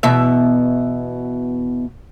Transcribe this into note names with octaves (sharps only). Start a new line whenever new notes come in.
E2 B2 E5